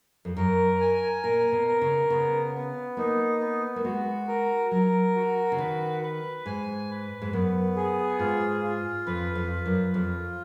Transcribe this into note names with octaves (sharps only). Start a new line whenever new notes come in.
F2
F#2 A#4
G#5
A#2 A#4
B2
A#4
C#3
C#3 B3
B3
A#3 D#4
B3
A#3
G#3 F#4
A#4
F#3 A#4
F#4
C#3
D#3 B4
B4
G#2 G#5
B4
G#2
F#2 B3
G#4
G#2 F4
F4
F2 B4
F2
F4
F#2
F2 F4